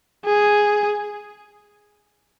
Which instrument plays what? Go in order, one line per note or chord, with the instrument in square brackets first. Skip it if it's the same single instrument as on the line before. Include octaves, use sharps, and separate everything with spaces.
[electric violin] G#4